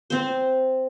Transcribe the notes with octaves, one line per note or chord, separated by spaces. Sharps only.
C4 C5